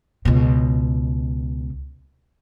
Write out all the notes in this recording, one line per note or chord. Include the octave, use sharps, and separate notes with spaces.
C#2 B2